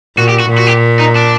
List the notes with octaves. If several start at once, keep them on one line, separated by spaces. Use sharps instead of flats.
A#2 F#4
G4
F#4
A#2
F#4
G4
D#4
D4